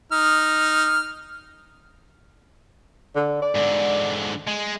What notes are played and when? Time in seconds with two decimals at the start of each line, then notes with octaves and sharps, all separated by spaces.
0.12 D#4 F6
3.16 D3
3.42 D5
3.56 G#2 D3
4.47 G#3